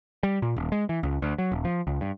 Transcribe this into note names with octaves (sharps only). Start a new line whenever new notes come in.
G3
A#2
D#1
G#3
E3
C#2
D2
F#3
D#1
F3
C#2
G2